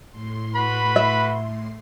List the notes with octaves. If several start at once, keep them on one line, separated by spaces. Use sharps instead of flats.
A2 C6
F#4 B4 B5
E5